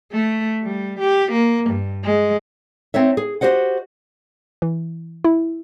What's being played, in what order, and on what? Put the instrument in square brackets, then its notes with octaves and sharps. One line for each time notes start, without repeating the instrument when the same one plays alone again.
[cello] A3
G3
G4
A#3
G2
G#3
[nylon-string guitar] C4 D#4 C#5 E5
G#4
F#4 G4 C5 D#5 F#5
[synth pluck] E3
E4